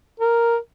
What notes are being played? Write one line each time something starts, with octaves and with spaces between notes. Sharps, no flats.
A#4